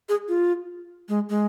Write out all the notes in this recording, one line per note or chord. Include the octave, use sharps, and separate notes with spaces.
G#4
F4
G#3
G#3